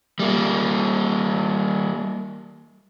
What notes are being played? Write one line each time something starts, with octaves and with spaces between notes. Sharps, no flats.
G3 A#3